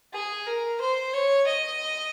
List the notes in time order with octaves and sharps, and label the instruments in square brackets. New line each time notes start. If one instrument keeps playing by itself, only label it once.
[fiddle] G#4
A#4
C5
C#5
D#5